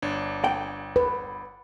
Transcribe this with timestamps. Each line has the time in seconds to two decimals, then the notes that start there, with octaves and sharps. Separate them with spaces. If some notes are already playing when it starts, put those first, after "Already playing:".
0.02 G1 D4 C#5
0.44 G5
0.96 B4